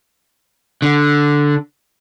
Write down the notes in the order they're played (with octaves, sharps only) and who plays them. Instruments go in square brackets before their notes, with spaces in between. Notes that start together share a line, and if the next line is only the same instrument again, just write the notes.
[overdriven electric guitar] D3